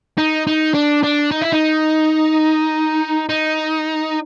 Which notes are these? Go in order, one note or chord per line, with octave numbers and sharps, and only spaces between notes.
D#4
D#4
D4
D4
D#4
E4
D#4
D#4